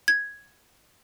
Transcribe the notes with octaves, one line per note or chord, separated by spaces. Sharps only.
G#6